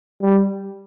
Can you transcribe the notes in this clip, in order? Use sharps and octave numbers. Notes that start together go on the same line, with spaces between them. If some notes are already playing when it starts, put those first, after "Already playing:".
G3